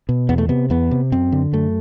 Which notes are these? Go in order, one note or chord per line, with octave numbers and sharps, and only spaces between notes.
B2
E2 B3
A3
C3 B3
E2 B3
C3
F#2 C4
D3
F#2 A3